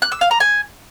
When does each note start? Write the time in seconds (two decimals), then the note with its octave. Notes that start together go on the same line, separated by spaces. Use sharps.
0.02 F#6
0.12 E6
0.21 F5
0.31 A#5
0.40 G#5